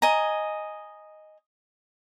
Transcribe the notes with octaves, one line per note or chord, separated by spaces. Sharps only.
D#5 G#5 A#5